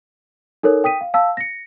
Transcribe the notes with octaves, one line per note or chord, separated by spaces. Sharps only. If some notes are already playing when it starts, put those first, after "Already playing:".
D#4 A4 A#4 C#5
G5 D#6 B6 D#7
F5
F5 A5 E6
A#6 C#7